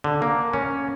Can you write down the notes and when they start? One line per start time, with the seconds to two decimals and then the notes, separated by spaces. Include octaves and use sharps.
0.04 D3
0.22 A#3
0.53 C#4